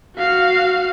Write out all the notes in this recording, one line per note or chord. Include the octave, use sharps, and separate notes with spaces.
F#4 F5